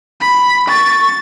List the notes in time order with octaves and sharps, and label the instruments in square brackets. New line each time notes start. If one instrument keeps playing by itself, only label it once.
[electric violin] B5
[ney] C#6 [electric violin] A6